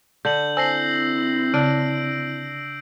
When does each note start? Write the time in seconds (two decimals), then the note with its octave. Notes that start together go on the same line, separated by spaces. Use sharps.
0.25 D3 G6 F#7
0.57 C4 E4 C5 G#5 A5 E6 A#6 C7
1.54 C#3 D4 D7